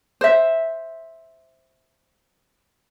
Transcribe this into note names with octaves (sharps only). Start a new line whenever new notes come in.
C5 E5